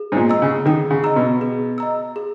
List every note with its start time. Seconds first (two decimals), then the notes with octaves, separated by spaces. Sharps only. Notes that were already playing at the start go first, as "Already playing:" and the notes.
Already playing: G#4
0.12 G#2
0.16 A#2
0.29 D#5 A#5 E6
0.42 C#3
0.66 D#3 G#4
0.90 C#3
1.04 D#5 A#5 E6
1.16 B2
1.41 G#4
1.78 D#5 A#5 E6
2.16 G#4